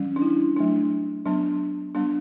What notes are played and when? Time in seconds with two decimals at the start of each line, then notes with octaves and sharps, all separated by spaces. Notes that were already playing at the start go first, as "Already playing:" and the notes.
Already playing: E3 G3 C#4
0.16 D4
0.22 E4
0.56 F#3 A3 D4
1.26 F#3 B3 D4
1.95 G3 B3 D4